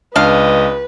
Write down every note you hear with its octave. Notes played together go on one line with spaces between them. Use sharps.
C#2 D4 B4 D#5 F5